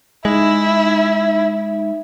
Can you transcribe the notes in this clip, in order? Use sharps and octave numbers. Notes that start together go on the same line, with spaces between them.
G#3 D#4 E4 E5